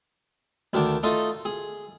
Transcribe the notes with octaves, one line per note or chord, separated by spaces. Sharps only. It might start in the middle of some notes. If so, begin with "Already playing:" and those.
D2 D#3 D4
A3 D#4 F4 D#5
G#4